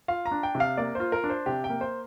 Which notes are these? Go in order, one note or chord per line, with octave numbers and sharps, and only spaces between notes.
F4 F5
A#5
D4
G5
C3
F5
A#3 D5
F4 C5
A#4
D4
C5
C3 G4
G5
A#3
C5